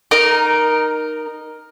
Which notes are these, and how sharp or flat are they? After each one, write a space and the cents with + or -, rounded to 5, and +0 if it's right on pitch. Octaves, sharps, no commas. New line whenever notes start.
D#4 -15 A#4 +10